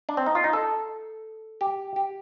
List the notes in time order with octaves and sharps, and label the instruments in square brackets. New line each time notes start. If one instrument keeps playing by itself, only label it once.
[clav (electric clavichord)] D4
C4
D#4
F4
D#4
A4
G4
G4